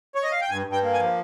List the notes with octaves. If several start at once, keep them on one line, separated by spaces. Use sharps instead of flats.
C#5
D#5
F5
G5
G2 G#5
G2
G5
A#3
G#5
F3